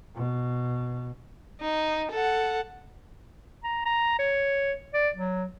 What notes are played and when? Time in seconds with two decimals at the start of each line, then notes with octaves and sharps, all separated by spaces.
0.15 B2
1.61 D#4
2.11 A4 F#5
3.64 A#5
3.86 A#5
4.19 C#5
4.94 D5
5.15 F#3